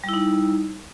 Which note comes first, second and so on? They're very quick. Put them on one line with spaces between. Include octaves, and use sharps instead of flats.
G3 E4 D#4